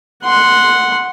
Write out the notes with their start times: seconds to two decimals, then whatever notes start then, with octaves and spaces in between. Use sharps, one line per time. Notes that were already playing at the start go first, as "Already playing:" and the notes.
0.24 F#5 C6